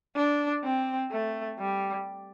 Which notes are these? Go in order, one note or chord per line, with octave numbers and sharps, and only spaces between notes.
D4
C4
A3
G3